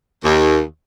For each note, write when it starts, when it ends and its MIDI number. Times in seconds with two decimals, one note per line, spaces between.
0.24 0.62 39